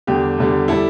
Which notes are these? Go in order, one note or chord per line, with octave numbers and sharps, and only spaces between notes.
E2 D3 G3 G4
E2 D3 G3
G3 E4 A4